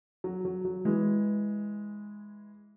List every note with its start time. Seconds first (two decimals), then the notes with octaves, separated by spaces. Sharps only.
0.24 F#3
0.45 F#3
0.65 F#3
0.85 E3 G#3